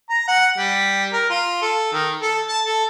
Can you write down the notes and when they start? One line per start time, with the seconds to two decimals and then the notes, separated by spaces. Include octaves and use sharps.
0.09 A#5
0.28 F#5
0.58 G3
1.12 A#4
1.30 F4
1.62 A4
1.93 D#3
2.21 A4
2.48 A5
2.65 A4